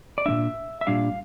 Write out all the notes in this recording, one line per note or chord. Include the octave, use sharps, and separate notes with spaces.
D5
A#2 G3 D4 E5
E5
A#2 G3 D4 F5